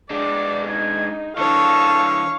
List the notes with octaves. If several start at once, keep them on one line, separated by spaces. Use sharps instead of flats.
G#3 D4 D5
D#4 G#6
E3 D4 A4 C#5 F5